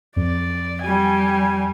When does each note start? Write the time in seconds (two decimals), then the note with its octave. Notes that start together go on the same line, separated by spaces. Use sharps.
0.16 F2 D5
0.83 G3 G#5